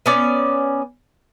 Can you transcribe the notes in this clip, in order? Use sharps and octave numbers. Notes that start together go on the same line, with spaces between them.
B3 C#4 D5